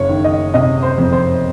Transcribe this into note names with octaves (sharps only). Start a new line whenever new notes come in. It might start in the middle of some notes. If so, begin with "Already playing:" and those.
Already playing: F#1 C#5
D#3
D#5
C3 D#5
C5
F2
C5